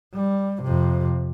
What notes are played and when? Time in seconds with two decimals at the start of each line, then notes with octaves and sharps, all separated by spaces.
0.14 G3
0.62 F2 C3